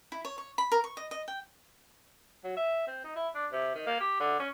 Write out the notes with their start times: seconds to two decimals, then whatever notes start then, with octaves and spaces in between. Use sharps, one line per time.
0.12 E4
0.25 C#5
0.38 C#5
0.58 B5
0.72 A#4
0.84 C#6
0.97 D#5
1.11 D#5
1.28 G5
2.44 F#3
2.57 E5
2.87 C4
3.04 D#4
3.16 E4
3.35 D4
3.52 C3
3.75 D#3
3.87 A#3
4.00 G4
4.20 D3
4.40 C#4